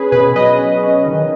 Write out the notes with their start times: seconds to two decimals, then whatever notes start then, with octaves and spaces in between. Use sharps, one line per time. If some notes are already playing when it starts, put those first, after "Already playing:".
Already playing: C#4 G#4 B4
0.12 B2 G#4 B4
0.35 F#3 B4 D#5
0.59 C#4
0.83 C#4
1.06 D#3